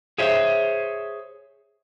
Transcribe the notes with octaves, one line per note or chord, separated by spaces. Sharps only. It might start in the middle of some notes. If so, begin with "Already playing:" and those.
G#4 C5 C#5 E5